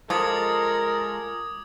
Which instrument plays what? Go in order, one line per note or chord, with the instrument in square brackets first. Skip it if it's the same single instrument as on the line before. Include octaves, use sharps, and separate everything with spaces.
[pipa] F3 [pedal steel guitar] G#3 F4 A4 [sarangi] A#4 [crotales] D6 D#6 G#6